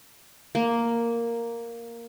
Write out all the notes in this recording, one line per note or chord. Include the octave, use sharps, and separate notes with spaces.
A#3